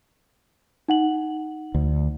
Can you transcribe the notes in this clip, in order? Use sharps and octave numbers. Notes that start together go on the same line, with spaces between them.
D#4 F#5 F#7
D2